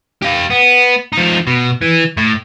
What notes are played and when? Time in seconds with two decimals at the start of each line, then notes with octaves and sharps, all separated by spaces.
0.22 G4 F5
0.50 B3
1.13 F3 D#4
1.47 B2
1.81 E3
2.17 A2